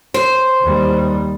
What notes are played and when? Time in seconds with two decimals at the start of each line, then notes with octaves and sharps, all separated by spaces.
0.14 C5
0.62 D#2 G3